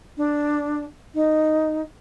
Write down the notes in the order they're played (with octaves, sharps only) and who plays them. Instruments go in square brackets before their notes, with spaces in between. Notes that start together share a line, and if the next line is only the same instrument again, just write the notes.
[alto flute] D4
D#4